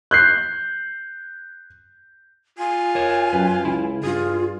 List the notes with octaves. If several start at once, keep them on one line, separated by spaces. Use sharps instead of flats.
F#6 G6 C7
F4 G#5
A#4 C#5
F#2 B4
C#2 E4
G2 F4 G#4